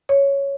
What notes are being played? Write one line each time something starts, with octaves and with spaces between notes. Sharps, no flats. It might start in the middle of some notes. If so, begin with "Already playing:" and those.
C#5